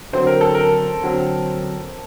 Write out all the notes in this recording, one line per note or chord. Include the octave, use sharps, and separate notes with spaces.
D3 F#3 C4 C5
A#4
A4
A#4
D3 F#3 C4